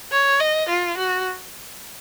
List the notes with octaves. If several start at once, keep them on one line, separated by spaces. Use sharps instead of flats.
C#5
D#5
F4
F#4